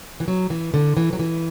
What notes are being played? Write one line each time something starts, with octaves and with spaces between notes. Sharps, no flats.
E3
F#3
E3
D3
E3
F#3
E3